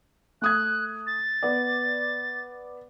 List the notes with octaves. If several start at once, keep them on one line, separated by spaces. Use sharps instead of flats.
A3 D#6 F#6 G#6
A6
B3 D5